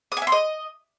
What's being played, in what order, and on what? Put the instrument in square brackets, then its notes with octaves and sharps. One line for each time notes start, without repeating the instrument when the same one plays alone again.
[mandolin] D#6
G#5
E5
C6
D#5